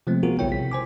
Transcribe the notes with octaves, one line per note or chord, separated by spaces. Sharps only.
C3 F3 G#3 A3 B3 C4
B3 F4 F#4 G#4 A#4
B1 C#3 G3 E4 C#5 G5
C3 B6
C5 G#5 D6